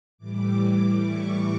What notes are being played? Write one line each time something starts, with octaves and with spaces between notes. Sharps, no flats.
A2 E3 G3 D6
C#6